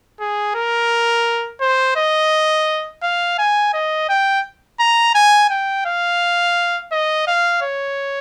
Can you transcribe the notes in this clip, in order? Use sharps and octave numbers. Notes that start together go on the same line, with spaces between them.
G#4
A#4
C5
D#5
F5
G#5
D#5
G5
A#5
G#5
G5
F5
D#5
F5
C#5